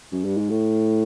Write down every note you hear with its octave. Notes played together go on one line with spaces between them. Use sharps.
F#2
G2
G#2
A2